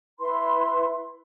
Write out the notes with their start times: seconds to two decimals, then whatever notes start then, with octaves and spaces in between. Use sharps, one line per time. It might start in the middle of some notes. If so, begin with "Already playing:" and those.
0.19 E4 B4 B5 C6